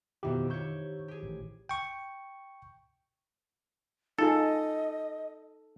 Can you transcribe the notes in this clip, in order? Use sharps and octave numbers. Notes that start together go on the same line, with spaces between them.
F2 B2 D#3 E4 G4
E4 G4 C#5 C#6 G6
G4 G#4
A1
G5 C#6
D#4 F4 G#4 A4 D#5